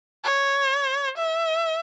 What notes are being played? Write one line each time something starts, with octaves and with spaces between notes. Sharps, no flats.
C#5
E5